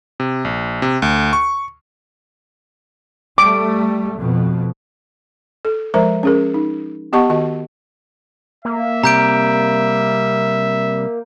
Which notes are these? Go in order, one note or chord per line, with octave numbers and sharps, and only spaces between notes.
C3
A#1
C3
D2
C#6
G3 A3 D6
F2 B2
A4
F3 G#3 A#4 C5 E5 A#5
C#4 G#4 A#4
D#4
B3 G4 D#5 F#5 A5 C#6
D#3 F#4 D#5
A#3 E5
C3 G3 A#5 G6 D7